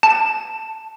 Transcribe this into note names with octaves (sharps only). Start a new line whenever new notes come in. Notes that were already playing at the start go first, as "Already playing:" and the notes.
A5